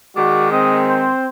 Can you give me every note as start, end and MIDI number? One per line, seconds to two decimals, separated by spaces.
0.16 1.09 51
0.16 1.09 56
0.16 0.50 66
0.16 0.50 74
0.52 1.28 60
0.52 0.77 75
0.88 1.27 72